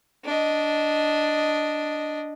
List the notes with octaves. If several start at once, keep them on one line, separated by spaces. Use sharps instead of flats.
D4 D#5